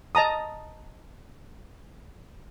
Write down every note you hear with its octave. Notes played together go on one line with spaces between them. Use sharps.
D#5 A5 A#5 D#6